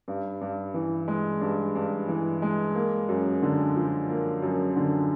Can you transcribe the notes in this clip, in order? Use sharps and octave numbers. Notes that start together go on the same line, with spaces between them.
G2
G2
E3
G#3
G2
G2
E3
G#3
A#3
F#2
D3
F3
A#3
F#2
D3